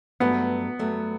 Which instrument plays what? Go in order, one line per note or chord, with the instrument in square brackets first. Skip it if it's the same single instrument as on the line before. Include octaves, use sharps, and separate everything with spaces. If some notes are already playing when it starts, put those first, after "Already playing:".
[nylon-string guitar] G2 F#3 A3 [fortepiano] B3
[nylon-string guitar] G2 F#3 A3